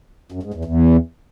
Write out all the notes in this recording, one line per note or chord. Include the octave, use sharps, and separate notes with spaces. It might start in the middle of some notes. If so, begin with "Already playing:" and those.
F#2
G#2
E2
E2